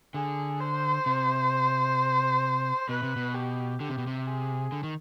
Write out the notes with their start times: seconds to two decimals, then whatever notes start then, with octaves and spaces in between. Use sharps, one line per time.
0.14 D3 G#4
0.60 C5
1.06 C3
2.89 B2 B4
3.03 C3
3.16 B2
3.35 G4
3.80 D3 G4
3.89 C3
3.98 B2
4.07 C3
4.27 G#4
4.72 D3
4.83 D#3